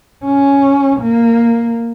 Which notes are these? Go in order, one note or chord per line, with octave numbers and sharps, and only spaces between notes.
C#4
A#3